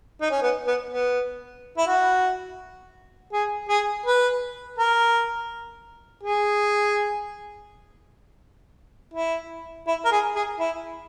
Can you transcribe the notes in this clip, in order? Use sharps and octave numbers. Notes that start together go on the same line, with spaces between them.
D#4
C#4
B3
B3
B3
E4
F#4
G#4
G#4
B4
A#4
G#4
E4
E4
A#4
G#4
G#4
E4